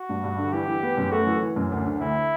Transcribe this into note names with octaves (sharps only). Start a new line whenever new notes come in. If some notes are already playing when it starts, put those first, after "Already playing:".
Already playing: F#4
G2
G2
D3
E3 G4
E3
B3
F#2
A3 F#4
E3
E3
F#2
D2
D3
D2 E4